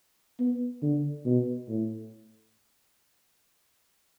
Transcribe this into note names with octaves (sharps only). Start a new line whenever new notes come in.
B3
D3
B2
A2